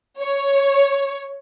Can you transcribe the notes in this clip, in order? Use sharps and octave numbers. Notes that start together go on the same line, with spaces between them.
C#5